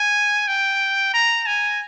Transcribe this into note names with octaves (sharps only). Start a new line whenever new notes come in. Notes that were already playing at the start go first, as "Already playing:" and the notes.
Already playing: G#5
G5
A#5
G#5